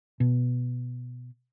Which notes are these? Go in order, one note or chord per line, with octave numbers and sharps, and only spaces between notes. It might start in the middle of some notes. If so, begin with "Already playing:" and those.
B2